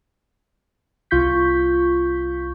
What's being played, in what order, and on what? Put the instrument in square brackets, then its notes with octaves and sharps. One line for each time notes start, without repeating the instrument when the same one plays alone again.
[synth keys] C2 F4 C#6 G6 B6